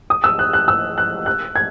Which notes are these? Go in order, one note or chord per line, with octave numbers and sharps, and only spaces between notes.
D#6
E6
F#6
F#6
E6
F#6
F#6
G#6